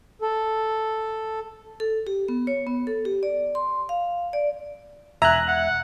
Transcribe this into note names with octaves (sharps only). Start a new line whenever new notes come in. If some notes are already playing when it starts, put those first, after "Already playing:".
A4
A4
G4
B3
C#5
B3
A4
G4
D5
C6
F5
D5
E1 E5 G#5 A#5 F#6
F#5